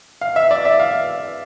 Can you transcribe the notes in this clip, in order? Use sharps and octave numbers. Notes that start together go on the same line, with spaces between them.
F5
E5
D5
E5
F5